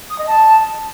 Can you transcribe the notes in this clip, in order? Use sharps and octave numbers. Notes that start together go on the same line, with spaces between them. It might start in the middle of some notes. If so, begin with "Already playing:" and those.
D#6
D#5
A5